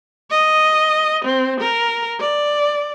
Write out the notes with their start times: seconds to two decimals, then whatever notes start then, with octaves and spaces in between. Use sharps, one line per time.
0.30 D#5
1.25 C4
1.61 A#4
2.20 D5